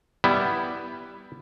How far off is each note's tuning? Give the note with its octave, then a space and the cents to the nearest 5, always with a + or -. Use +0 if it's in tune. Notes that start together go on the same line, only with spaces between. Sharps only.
G3 +0 B3 +0 E4 +0